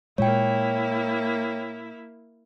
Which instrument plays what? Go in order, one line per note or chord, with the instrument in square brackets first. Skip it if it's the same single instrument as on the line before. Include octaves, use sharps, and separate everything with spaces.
[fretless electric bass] A#2 G#3 [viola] A#3 E4 [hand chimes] C#5 G5